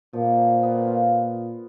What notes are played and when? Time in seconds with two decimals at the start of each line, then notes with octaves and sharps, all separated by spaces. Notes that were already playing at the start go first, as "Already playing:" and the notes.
0.13 A#2 F3
0.38 F3
0.63 B3
0.87 F4